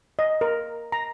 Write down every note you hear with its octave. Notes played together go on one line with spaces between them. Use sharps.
D#5
A#4
A#5